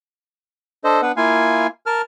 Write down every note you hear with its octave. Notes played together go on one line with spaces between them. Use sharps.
D4 A4 C5 D#5
B3 D4 B4 F#5
A#3 E4 F4 F5 G#5
A#4 A5 F6